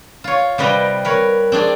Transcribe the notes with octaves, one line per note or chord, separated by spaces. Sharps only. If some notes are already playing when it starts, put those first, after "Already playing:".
F4 C#5
C3 G3 B4 D#5 G5 A#5
A#4 B4 C#5
C4 D4 G#4 D5